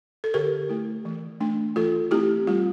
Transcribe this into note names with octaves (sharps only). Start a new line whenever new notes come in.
A4
D3 G4 A#4
A3 E4
E3
A3 D4
E3 F4 A4
A3 C4 E4 G4
G3 F4